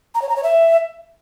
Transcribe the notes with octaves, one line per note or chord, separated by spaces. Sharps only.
A#5
C#5
A#5
C#5
E5